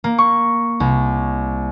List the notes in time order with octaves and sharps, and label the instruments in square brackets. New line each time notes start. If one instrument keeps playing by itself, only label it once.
[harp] A#3
C#6
C2